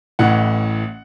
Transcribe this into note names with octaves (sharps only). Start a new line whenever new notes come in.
A1 A2 E3 F#5